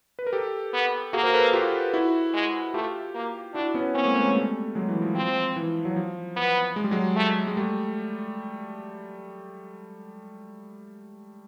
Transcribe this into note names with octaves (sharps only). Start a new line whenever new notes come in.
B4
A#4
G4 A4
B3
A#3 F#4 G#4
A#4 C5
A4 B4
F4 G4
E4 F#4
G#3
A3 F4 G4
A#3
D4 E4 F#4
B3 C#4
A#3 C4 C#4
G#3 A#3
A3 B3
G#3 A#3
G3 A3
F#3 G#3
E3
F3
F3 C4
E3
F#3
F3
B3
G#3
G3
F#3 G#3
A3
G#3
G3 A3